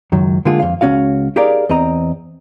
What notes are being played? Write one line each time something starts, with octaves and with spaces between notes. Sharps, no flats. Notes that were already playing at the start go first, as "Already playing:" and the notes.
C#2 F#2 D#3 F#3
D3 G#3 A#3 F4 G#4
F2 F5
C#2 F#2 C#4 F#4 F5
D#4 G4 G#4 A#4 D5 F5
E2 C4 D#5 A#5